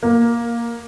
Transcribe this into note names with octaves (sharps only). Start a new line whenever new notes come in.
A#3